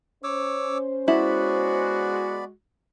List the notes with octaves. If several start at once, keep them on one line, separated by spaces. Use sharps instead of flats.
C#4 C5 C#5 D6 E6
G#3 B3 E4 F#4 D5 B5